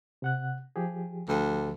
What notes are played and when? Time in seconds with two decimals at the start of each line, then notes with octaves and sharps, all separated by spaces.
0.22 C3 F#5 F#6
0.76 F3 G4 G#4
1.29 D2